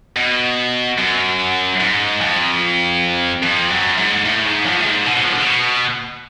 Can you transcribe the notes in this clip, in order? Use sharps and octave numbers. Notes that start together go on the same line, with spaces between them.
B2
F#2
G#2
F2
F2
F#2
G#2
A2
G#2
F2
A2
G#2
B2
F#3
F3
D3
C#3
B2